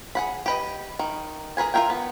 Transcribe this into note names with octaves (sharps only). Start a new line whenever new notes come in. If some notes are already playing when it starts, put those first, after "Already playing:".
G#4 F#5 B5
G4 B4 D#5
D#3
G#4 A#4 B4 G#5
F4 G#4 A#4 E5 G5
B3